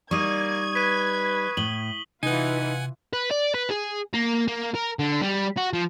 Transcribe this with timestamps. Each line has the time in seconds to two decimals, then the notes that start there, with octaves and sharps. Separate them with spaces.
0.11 G3 A#3 D#4 C#6 D#6 G#6 D#7
0.75 B4 B6 D#7
1.57 A2 F#7 G7
2.23 C3 E3 D#4 F4 B4 F#5 G#5
3.13 B4
3.31 D5
3.54 B4
3.70 G#4
4.14 A#3
4.48 A#3
4.75 A#4
4.99 D3
5.21 G3
5.57 F#4
5.73 F3